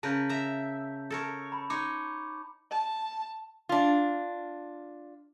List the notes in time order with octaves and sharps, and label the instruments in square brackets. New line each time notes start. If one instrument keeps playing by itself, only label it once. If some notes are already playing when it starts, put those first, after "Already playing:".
[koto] C#3 A#4 B4 [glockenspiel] A5 G6
[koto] E5 A#5
A4 A#4 C#5
[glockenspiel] A#5 B5
[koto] D#4 C#5 [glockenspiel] C6 D6
[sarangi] A5
[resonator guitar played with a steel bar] D4 F4